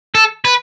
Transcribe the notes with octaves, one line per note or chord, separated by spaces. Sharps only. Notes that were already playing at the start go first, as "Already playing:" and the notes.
A4
B4